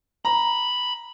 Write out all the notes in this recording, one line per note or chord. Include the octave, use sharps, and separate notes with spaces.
A#5 B5